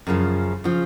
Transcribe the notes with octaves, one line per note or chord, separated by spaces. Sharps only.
F#2 C#3 F3
C#3 F3